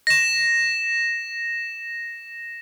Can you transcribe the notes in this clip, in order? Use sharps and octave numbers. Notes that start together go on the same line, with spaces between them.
A#6 E7